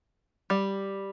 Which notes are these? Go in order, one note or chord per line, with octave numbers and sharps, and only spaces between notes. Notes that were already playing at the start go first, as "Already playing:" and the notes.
G3